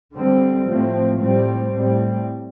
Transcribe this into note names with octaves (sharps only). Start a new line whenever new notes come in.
D3 G3 C4
A2 F3 A3 C4
A2 G3 C4
A2 G3 C4